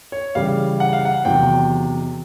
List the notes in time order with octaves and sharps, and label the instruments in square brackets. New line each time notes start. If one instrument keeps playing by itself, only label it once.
[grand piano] C#5
C#3 E3 G3 F5
F#5
F5
F#5
E2 C3 D#3 F#3 G5